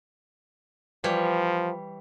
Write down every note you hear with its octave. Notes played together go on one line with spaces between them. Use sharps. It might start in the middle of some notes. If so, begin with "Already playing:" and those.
E3 F3 G3 C#5